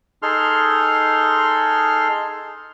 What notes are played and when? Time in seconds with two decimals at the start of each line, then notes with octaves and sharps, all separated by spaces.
0.22 D#4 G#4 A4 C6 F6